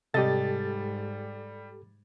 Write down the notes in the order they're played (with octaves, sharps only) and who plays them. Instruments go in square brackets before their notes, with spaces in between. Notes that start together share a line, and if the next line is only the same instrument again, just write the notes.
[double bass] G#2 [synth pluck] C3 D#5 [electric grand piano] G3 A6 [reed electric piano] G4 A4